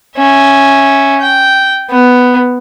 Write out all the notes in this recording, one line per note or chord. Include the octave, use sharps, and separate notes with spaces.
C#4 E5
G5
B3